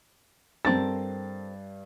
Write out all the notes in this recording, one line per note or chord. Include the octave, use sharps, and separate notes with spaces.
G2 C4 A4 A#4 A6